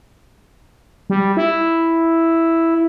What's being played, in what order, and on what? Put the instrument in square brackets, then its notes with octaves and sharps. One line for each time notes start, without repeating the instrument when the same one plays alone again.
[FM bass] G3
E4